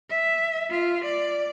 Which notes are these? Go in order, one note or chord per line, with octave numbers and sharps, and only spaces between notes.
E5
F4
D5